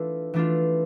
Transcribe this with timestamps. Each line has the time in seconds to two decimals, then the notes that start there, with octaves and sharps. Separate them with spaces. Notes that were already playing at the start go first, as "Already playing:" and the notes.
Already playing: E3 A3 D4 F4
0.34 E3 A3 D4 F4